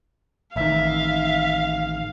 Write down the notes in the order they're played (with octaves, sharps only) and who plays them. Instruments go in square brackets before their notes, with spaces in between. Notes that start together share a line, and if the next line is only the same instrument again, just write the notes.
[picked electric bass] A1 D#3 [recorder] E5 [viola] F5